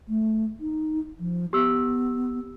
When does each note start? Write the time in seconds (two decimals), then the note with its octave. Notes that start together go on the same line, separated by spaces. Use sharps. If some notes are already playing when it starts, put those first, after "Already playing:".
0.08 A3
0.60 D#4
1.20 F3
1.53 B3 G4 E6